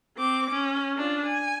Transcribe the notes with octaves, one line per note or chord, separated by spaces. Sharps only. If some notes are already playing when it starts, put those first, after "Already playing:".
C4 D6
C#4
D4 F4
G#5